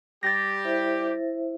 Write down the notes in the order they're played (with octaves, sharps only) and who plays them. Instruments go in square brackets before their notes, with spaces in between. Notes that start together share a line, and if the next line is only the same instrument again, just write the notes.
[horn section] G3 G4 [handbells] A6 A#6
[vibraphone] E4 C5 E5